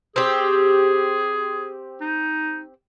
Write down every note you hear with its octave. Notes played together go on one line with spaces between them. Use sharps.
C4 G4 G#4
D#4